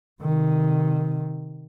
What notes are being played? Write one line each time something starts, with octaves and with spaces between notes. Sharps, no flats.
C3 D#3